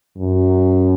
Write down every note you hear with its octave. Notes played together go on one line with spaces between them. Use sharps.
F#2